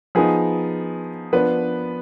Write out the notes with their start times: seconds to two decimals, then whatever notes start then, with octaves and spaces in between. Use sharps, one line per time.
0.15 F3 B3 D#4 G#4
1.33 F3 B3 D4 B4